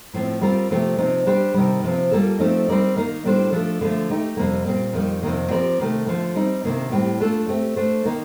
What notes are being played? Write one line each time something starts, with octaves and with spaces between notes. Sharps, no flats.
A2 F3 C4
G3 C4 F4 A#4
C3 F3 A3 C4 G4
C3 F3 C4 D#4
G3 D4 G4 C5
C3 D#3 G3
C3 F3 C4
G3 A#3 F4 A4
F3 A3 C4 D#4
G3 C4 D#4 A#4 D5
D#3 A#3 D#4
A2 G3 D4 A4 C5
F3 A3 D4 A4
D3 F3 A3
A3 D#4 G4
F2 C3 G3 A#3
A#2 G3 C4
F2 D#3 G3
F2 C3 D#3 A#3
F3 C4 G4 A#4 D5
C3 D#3 A3
D3 F3 A3
G3 C4 D#4
C3 D#3 A#3 D4
A2 G3 C4 G4
A3 D4 F4 A4
A3 C4 G4
A3 D4 A4 C5
D#3 A#3 D#4